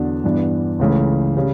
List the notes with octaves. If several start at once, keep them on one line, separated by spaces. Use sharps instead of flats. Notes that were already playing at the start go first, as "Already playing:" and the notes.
Already playing: E2 D3 F#3 B3 D4
G2 E3 B3 D4
C#2 C#3 E3 A3
C#3 G3